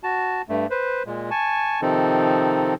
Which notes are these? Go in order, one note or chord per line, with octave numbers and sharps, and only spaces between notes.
F#4 A5
G2 A3
B4 C5
A#2 G#3
G#5 A5 C#6
C3 D#3 F3 C4 D#4 A4